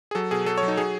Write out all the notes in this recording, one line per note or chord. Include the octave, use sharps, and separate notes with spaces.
G#4
F#3 A4
B2 G#4
F#3 A4
C#5
F#3
D#4
F#3 G#4